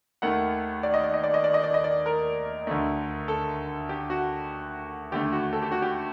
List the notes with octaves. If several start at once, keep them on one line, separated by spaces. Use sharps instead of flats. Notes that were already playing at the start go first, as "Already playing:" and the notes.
D#2 D#3 A3 F#5
D5
D#5
D5
D#5
D5
D#5
D5
D#5
D5
D#5
D5
A#4
D2 D3 A3
A4
G4
F#4
D#2 D3 A3 G4
F#4
A4
G4
F#4
G4